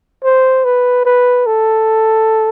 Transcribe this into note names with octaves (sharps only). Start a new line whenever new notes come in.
C5
B4
B4
A4